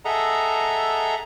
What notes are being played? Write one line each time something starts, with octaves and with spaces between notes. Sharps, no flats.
G#4 A4 D#5 E5 F#5 A#5